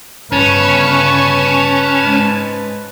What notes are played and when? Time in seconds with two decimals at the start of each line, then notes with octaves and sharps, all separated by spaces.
0.32 G1 C#3 C#4 B4 A5 C#6
2.01 G#2